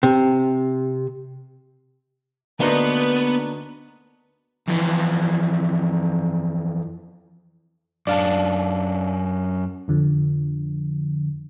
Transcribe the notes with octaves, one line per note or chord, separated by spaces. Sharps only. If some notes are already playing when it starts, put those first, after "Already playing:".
C3
D2 A#3 B3 D4 D#4 B4 C6
F2 E3
F#2 D4 D5 F5 A5
F2 D3 F3